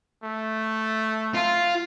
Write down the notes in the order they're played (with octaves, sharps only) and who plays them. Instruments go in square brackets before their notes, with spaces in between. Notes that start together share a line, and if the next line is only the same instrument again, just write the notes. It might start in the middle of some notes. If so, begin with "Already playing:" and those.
[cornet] A3
[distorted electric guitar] F4